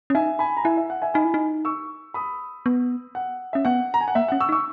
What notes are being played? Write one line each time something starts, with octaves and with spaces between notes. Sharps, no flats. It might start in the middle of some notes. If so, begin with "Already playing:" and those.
C#4
D#4 E5 G#5
G#5 B5
A#5
E4 E5 G#5
E5
F#5
E5 G#5
D#4 G#5 B5
E4
D#4
C#6 E6
B5 D#6
B3
F#5
C#4 E5
B3 F#5
A#5
G#5
F#5
A#3 E5
C#4 F#5
C#6 E6
D#4
C#6 E6